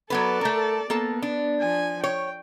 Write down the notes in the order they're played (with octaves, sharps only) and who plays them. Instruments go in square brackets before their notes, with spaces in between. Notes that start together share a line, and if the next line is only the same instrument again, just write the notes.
[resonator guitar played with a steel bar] F#3 B3 B4 [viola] A4 D5
[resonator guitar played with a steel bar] A3 A#4
[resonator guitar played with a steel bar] A#3 A4 A5 [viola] B3
[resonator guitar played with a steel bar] D4
[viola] F3 G#5
[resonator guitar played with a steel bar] C#5 [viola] G5